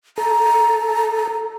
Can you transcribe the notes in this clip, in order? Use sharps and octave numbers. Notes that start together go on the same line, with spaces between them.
A4 A#5